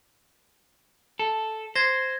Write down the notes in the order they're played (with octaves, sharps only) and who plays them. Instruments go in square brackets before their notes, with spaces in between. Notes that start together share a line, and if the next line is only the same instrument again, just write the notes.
[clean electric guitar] A4
[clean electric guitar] C5 [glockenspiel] G#6 A#6